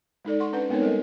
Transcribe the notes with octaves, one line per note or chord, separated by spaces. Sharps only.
G#3 D#4 A4 D5
F#5 C6 C#6
C#4 D4 B4 F#5
G#3 B3 C4 D#4 A#4 C#5
G3 A4 A#4 D#5